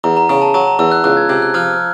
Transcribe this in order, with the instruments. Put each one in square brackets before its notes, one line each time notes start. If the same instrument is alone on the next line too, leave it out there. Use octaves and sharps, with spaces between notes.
[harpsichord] E2 [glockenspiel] A#5
[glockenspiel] A#5
[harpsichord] C#3 [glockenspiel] A#5
[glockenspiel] A5
[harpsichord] F#3 [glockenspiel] A#5
[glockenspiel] A#5
[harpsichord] E2 [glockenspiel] E6
[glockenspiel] F#6
[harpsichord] C#2 [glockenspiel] F#6
[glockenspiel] G#6
[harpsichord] C3 [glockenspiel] G6
[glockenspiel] F#6
[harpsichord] F3 [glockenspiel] F6